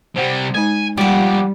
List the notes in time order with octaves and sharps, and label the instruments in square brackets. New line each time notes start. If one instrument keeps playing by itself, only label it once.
[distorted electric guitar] C3 G3 [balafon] C5 F#5
[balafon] G#3 D#4 [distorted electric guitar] G#5
[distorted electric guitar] F3 D5 [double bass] G3 [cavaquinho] G4 F#5